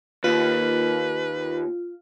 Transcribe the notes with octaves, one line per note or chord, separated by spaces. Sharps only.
D#2 F4 B4